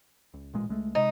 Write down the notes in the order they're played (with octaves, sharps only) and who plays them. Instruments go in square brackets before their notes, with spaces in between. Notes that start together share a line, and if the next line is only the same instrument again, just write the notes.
[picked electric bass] C#2
A1 A#2 G#3
C#2 G#3 A3
[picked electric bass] C3 G#3 [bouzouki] D#4